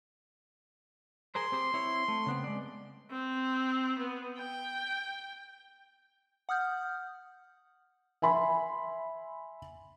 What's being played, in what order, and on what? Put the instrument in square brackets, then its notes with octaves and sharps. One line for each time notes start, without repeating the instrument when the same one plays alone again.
[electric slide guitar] G#4 A#4 C5 [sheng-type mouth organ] C6
[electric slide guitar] C4 G4 C5
C4 E4 C#5
A3
C#3 B3 C4
G#3 D5
[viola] C4
B3
G5
[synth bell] F#5 D#6 F6 G6
[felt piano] E5 G#5 B5 C6